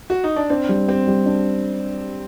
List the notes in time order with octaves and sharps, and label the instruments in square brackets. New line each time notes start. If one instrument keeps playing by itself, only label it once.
[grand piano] F#4
D#4
D4
[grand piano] C4 [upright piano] D4
[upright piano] G3
[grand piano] C4 [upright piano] G4
[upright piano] G3
D4